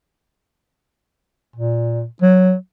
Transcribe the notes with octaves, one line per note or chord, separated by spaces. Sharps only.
A#2
F#3